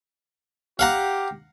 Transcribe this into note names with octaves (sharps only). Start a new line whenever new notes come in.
G4 F5 F#5 A#5